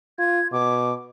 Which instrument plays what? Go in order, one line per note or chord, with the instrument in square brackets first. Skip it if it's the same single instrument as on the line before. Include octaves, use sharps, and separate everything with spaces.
[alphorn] F4 [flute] G#6
[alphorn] B2 [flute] D6